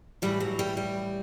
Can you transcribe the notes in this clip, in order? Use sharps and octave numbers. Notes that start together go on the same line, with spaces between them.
A2 E3 G3
F#3
G3
G3